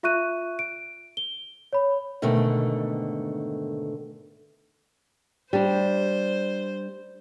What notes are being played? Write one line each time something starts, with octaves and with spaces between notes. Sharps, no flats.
F4 E5 C#6 F#6 D#7
D7
G7
C#5 B5
G#2 B2 D3 D#3 A3
G3 D4 C5